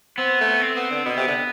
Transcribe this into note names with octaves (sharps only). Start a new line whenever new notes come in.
B3 C4
A3
C4
B3
D3
B2 B3
C3
D3